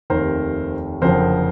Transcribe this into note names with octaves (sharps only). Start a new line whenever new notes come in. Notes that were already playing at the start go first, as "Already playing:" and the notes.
F1 D#2 D#3 A#4 C5
F#1 F2 D3 F3 A#4 C5